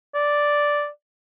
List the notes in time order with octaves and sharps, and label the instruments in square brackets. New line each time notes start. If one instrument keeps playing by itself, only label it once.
[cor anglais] D5